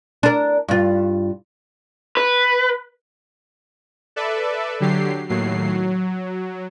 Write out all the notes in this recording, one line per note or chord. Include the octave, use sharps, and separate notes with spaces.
D4 A#4
G2 F4
B4
A4 B4 D5 E5
D3 F#3 G4 C7
D#2 A2 F#3 C7
F#3